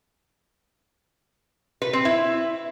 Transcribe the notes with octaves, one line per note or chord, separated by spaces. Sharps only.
B4
C4
E4